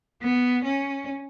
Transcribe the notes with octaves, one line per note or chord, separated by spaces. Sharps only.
B3
C#4